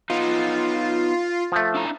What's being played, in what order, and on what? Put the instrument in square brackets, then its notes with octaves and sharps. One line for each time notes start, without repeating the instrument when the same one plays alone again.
[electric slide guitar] B3 D#4 [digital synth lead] F4
[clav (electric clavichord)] F3 A3
[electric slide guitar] D4 E4 A#5